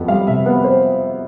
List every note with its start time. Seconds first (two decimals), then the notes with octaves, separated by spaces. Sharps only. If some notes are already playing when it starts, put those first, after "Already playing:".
Already playing: F2 B3
0.08 G3 F5
0.27 C3 E5
0.46 B3 B4
0.64 C5